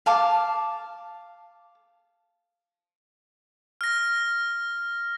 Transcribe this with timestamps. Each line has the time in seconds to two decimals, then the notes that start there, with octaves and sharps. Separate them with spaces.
0.06 F5 A5 D6
3.81 F6 A#6